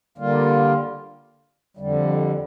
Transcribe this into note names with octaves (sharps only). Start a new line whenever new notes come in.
D3 G3 A#3 F4
F2 D3 G3